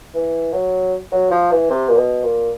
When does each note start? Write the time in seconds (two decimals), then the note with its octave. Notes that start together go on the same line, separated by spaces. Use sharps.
0.14 E3
0.53 F#3
1.12 F#3
1.31 F3
1.51 E3
1.70 C3
1.89 A#2
1.97 B2
2.23 A#2